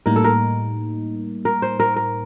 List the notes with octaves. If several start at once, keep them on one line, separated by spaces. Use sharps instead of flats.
A2 G3 A#3 D#4 A#4
A4
A#4
A#4
C5
A#4
A#4